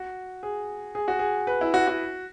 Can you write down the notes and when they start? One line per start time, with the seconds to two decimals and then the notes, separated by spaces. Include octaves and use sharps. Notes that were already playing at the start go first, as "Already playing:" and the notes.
Already playing: F#4
0.43 G#4
0.95 G#4
1.08 F#4
1.19 G#4
1.47 B4
1.61 E4
1.74 F#4
1.87 F#4